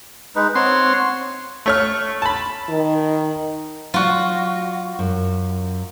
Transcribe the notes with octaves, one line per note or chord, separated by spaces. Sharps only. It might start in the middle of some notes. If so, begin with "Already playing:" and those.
G#3 D#4 B4
C4 C#5 F#5 C6
A3 C#5 F6
A5 B5
D#3
F#3 F4 F#4 D5
F#2